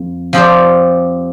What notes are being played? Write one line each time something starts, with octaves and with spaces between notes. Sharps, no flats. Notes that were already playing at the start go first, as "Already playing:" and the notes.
Already playing: F2
F3 C4 G4 D5